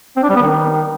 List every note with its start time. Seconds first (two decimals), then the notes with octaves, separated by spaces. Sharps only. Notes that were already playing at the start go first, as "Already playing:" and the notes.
0.16 C4
0.23 D4
0.29 G3
0.36 B3
0.42 D#3